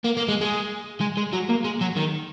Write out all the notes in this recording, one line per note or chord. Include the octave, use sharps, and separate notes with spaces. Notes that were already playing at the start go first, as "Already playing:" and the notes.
A#3
A#3
G#3
G#3
G#3
G#3
F#3
A#3
G#3
F#3
D#3